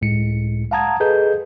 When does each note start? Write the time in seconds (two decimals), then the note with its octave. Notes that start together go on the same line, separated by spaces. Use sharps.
0.01 C#2 A2 G#3 C#7
0.71 F5 F#5 A5 A#5 D#6 G#6
1.00 G#4 A4 B4 D#5 G6